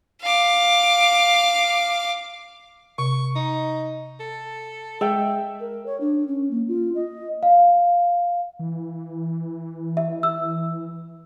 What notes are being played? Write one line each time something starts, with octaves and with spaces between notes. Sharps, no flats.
F5 D6
C3 C#6
D#4
A4
G#3 E5 G5
A#4
C#5
D4
C#4
A#3
F4
D#5
F5
E3
E5
E6